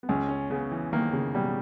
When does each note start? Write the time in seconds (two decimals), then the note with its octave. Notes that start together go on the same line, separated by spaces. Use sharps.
0.03 B3
0.09 C#2 C#4
0.29 C#4
0.50 C#3 B3
0.71 E3
0.93 D#3 A#3
1.13 C#3
1.34 B2 G3